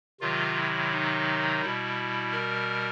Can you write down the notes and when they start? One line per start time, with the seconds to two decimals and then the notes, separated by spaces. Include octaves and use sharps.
0.21 C3 D#3 F#3 F4
0.57 E4
0.91 D#4
1.61 B2 G3 E4
2.32 A#4